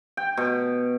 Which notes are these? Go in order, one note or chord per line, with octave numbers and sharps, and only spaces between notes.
G5
B2